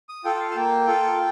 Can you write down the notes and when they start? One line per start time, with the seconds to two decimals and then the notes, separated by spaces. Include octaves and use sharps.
0.09 D#6
0.25 F4 A4 G5
0.35 G5
0.40 F5
0.51 A5
0.56 A#3 G5
0.87 F4 A4